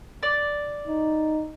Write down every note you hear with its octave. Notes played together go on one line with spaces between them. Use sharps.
D5
D#4